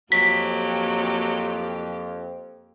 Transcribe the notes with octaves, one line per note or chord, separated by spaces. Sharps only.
F2 F#3 A#3 G4 B6